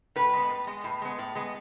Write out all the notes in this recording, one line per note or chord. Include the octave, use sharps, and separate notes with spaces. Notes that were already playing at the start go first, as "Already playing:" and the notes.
A2 B4
G#3 B3
A2
G#3 B3
A2
G#3 B3
A2
G#3 B3